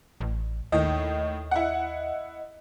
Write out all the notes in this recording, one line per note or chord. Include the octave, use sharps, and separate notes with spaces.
A1
D#2 A2 D#3 D#5
E4 F#5